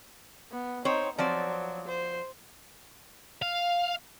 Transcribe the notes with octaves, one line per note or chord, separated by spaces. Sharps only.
B3
C4 D#4 C5 C#5
F3 F#3 C4 D5
C5
F5